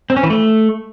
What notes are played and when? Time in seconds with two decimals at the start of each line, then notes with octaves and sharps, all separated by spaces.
0.10 C4
0.17 C#4
0.23 E3
0.30 A3